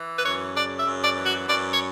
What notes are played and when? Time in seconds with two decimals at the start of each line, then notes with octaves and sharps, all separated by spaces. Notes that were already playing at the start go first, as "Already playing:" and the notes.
Already playing: E3
0.18 B4
0.24 F#2 C#5
0.54 C#3 D5
0.78 E5
0.86 F#2
1.02 D5
1.16 E3
1.24 F#4
1.47 F#2 D5
1.71 C#5